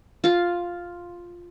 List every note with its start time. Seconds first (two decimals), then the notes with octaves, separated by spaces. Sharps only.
0.24 F4 F5